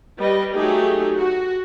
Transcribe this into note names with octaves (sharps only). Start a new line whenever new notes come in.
G3 B4 D#5
F#3 A3 D#4 G4 G#4
F#4